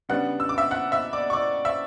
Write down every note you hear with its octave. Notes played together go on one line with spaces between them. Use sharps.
C#3 G3 B3 D4 F#5 F#6
E6
D6
E5 E6
F#5 F#6
E5 E6
D5 D6
C#6
D5 D6
E5 E6